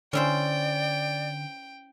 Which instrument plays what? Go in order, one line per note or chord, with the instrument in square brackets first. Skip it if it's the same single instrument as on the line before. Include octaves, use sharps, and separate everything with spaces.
[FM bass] D3 [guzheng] C#4 E4 C5 [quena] D5 [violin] G5